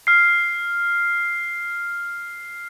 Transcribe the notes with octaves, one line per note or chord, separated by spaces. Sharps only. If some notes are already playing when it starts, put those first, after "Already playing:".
F6 C7